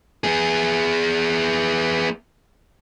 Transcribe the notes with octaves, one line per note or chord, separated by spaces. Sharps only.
B3 G#4